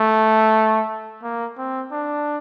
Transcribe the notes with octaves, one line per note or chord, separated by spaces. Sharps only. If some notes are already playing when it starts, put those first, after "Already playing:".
Already playing: A3
A#3
C4
D4